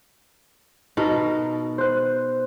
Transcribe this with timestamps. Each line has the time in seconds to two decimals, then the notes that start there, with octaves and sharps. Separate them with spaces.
0.97 B2 D#4 A4 A#4
1.78 C5 F#6